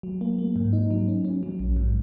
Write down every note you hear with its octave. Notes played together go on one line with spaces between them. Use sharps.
F#3
A#3
A#3
G#2
D#4
F#3
C#4
C#4
F#3
A#1
G#2